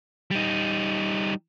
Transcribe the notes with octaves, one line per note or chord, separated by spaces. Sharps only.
G3 D#4